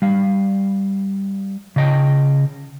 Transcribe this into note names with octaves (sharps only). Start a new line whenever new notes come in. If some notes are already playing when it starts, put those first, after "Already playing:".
G3 F5
C#3 D#5 G5